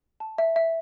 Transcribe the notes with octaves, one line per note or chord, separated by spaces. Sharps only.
A5
E5
E5